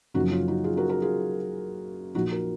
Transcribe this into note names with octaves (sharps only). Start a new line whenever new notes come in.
F#1 F#2 C#3 F3 D#4 F#4
C#4 F4
D#4 F#4
F4 G#4
F#4 A#4
F#4 A#4
F4 G#4
A#1 A#2 F3 D#4 F#4
F#4 A#4